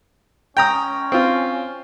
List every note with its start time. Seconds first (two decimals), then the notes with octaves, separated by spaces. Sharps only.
0.57 C#4 G5 A#5 D#6
1.12 C4 F4